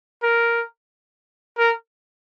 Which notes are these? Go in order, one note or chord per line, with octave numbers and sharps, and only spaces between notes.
A#4
A#4